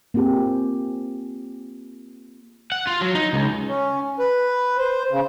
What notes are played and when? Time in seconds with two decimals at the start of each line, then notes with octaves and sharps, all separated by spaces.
0.14 A#3 C4 F4 G4 G#4
2.72 F#5
2.87 F4
3.01 F#3
3.15 D#4
3.33 C#2
3.68 C#4
4.19 B4
4.78 C5
5.11 C#3